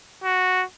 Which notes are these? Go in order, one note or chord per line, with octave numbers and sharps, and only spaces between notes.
F#4